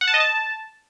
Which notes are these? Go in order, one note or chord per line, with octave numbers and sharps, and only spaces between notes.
F#5
A5
D#5
A5